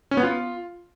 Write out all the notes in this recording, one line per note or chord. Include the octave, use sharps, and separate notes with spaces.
C#4
B3
F4